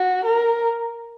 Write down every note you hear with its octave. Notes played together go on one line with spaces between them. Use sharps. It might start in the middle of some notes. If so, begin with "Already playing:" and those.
Already playing: F#4
A#4